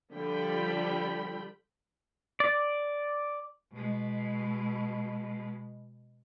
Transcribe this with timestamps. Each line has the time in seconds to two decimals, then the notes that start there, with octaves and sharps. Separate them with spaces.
0.14 D3 F3 G3 G5 B5
2.40 D5
3.74 B2 G#3